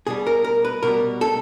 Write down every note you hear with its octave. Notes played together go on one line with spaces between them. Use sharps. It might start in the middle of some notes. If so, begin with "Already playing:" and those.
B2 G3 G#4
A#4
A#4
B4
B2 G3 A#4
A4